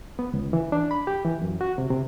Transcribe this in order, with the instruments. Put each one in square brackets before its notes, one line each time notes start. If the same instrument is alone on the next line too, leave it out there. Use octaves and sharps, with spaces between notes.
[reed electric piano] B3
C#2
E3
D4
B5
G4
E3
F#2
F#4
C3
C3